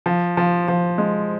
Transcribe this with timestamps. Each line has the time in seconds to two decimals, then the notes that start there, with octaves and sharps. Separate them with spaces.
0.06 F3
0.37 F3
0.68 F3
0.98 G#3